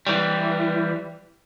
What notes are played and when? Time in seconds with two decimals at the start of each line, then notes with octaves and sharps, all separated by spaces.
0.07 E3 G3